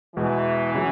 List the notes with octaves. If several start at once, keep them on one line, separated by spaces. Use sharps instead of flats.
E2 B2 E3 G#3
C#3 F#3 E4